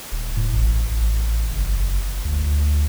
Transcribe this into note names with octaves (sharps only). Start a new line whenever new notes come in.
D#1
A2
A1
A1
F#1
D2